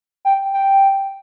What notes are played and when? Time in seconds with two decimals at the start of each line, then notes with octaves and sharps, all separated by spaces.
0.25 G5
0.53 G5